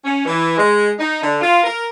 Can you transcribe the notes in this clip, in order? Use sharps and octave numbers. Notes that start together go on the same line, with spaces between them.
C#4
E3
G#3
D#4
D3
F4
A#4